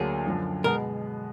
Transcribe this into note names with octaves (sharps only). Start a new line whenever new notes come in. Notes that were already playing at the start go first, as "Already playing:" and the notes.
Already playing: D2 D3 F#3 A#3 G#4
F#2 D3 F3
B2 G#3 B3 A#4